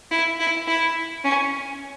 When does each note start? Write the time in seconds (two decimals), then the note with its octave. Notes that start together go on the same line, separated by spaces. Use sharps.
0.11 E4
0.40 E4
0.67 E4
1.24 C#4